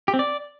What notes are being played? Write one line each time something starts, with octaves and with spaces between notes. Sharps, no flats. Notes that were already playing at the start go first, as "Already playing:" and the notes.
G4
C4
D5